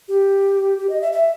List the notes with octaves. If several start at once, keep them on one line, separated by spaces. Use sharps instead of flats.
G4
G4
D#5
E5
E5